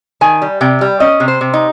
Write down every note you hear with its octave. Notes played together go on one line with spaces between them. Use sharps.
D#3 G#5
G3
C3 G5
G3
C#4 D#5
C3
C5
C3
D#4